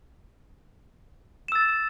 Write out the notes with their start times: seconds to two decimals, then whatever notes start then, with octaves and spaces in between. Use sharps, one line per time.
1.48 E7
1.52 E6
1.55 A6